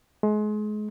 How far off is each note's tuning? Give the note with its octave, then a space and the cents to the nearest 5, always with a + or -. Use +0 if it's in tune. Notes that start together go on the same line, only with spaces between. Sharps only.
G#3 +30